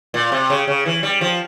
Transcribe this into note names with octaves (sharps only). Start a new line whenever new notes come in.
A#2
C3
C#3
C#3
E3
G3
F3